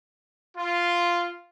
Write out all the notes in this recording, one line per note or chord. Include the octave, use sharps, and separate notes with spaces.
F4